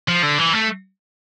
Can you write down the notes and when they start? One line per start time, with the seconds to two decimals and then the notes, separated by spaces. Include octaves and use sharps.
0.09 F3
0.23 D3
0.39 E3
0.53 A3